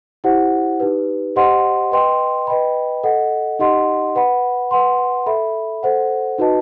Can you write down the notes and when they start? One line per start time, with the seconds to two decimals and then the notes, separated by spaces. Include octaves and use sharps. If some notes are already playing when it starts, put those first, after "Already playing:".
0.24 E4 G4 C5 F#5
0.80 D#4 G4 B4
1.36 G4 C5 D#5 F#5 C6
1.92 B4 D#5 G5 C6
2.47 B4 D#5 G5 B5
3.03 A4 D#5 F#5
3.59 D#4 G4 D#5 F#5 C6
4.15 B4 F#5 B5
4.71 B4 F#5 C6
5.26 A4 E5 B5
5.83 A4 C5 F#5
6.38 D#4 F#4 B4 D#5 A5